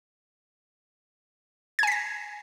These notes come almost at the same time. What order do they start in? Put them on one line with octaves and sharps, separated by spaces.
G#6 G#5 B6 A#6